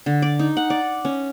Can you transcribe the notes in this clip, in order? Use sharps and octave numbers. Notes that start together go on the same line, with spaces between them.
D3
D5
D#4
F#5
D5
C#4